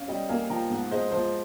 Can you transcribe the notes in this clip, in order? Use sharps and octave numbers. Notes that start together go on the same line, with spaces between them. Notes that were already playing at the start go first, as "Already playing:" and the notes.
Already playing: C#4 C#5 F5
G3 D#5 G5
A#3 F5 G#5
F3 G5 A#5
G#2
G#3 C5 D#5
F3 C5